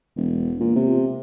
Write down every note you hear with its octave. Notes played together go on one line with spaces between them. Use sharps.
E1
A#2
C3